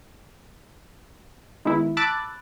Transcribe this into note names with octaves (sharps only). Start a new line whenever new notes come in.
D#3 G#3 B3 E4
A5 B5 D6 E6 F#6 A6